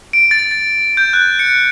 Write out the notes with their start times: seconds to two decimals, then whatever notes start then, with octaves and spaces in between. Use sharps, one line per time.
0.13 D7
0.31 A6
0.51 A6
0.97 G6
1.13 F#6
1.39 C#7